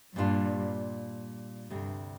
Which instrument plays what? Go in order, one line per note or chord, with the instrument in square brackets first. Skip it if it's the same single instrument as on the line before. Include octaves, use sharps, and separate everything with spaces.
[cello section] G2 [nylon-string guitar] A#2 G3 D4 F4
[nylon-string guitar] D2 C3 G3 [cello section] G2